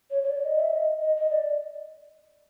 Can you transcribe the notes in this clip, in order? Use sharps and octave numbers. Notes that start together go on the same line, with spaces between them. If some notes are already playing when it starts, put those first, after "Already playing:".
C#5
C#5
D5
D#5
E5
D#5
D#5
D#5
D5